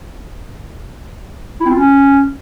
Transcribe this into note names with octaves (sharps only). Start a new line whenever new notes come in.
E4
C4
F4
C#4